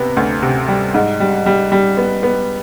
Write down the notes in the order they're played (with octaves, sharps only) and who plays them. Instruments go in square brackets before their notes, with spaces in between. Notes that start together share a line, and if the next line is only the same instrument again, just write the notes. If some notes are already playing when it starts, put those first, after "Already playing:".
Already playing: [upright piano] C3 B3
D2
C3
G3
G#2
G3
G3
G3
B3
B3